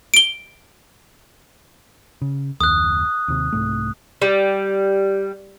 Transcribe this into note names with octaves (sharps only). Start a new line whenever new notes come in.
D7 G7
C#3
F#1 D#2 D#6 F#6
D#2 C3
C2 G#2 A3
G3